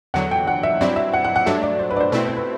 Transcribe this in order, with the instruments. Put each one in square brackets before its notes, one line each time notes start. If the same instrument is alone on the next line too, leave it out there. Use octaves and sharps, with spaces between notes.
[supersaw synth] E2 D3 F#3 [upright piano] F#5
[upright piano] G5
F#5
E5
[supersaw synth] G2 F#3 C4 E4 [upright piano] D5
[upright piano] E5
F#5
F#5
F#5
[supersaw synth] G2 F#3 A3 D4 [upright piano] E5
[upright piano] D5
C5
B4
D5
C5
[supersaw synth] B2 A3 C4 E4 [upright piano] B4
[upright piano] C5
B4